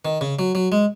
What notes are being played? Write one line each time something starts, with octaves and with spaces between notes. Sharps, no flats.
D#3
C#3
F#3
F#3
G#3